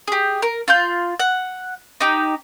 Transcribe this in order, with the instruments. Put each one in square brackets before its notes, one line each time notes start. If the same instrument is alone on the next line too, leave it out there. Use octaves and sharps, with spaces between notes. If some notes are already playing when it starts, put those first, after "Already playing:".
[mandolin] G4 G#4
A#4
F4 C6 G6
F#5
D#4 G4